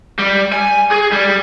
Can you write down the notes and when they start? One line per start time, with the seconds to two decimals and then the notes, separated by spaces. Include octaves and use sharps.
0.19 G3
0.52 G#5
0.92 G#4
1.13 G3